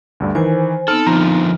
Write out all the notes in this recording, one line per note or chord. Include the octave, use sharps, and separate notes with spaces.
D2 G2 D3
D#3 E3 C5 G#5
B3 C4 D#4 A4 F6
D3 F3 A#5